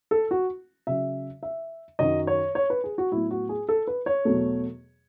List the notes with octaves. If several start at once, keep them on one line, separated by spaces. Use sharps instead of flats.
A4
F#4
C#3 F#3 C#4 E5
E5
F#2 D#3 F#3 D#5
C#5
C#5
B4
G#4
F#4
A2 F#3 B3 E4
F#4
G#4
A4
B4
C#5
E2 B2 F#3 A3